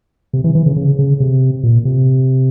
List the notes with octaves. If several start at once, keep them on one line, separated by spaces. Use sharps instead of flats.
C3
E3
E3
C#3
C#3
C#3
C3
A#2
C3